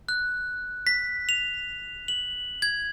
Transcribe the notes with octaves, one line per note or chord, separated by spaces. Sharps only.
F#6
B6
F7
F#7
G#6